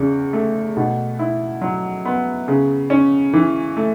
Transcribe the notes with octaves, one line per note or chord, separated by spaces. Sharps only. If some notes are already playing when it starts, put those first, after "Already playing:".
Already playing: E2 C#3 C#4
A3
B2
E4
F#3
B3
C#3
C#4
E3
A3